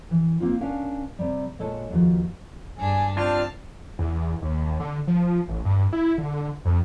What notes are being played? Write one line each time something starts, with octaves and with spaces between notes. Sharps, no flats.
E3
A#3 C4 D#4 F4
B3 C#4 D4 A#4 F5
C3 G3
A#2 G#3 A4 C#5 A5
D#2 F3 F#4
G2 D4 G#4 G#5
C4 D4 F4 G4 D5 A5 F6
E2
D#2
D3
F3
A1
G2
E4
D3
F2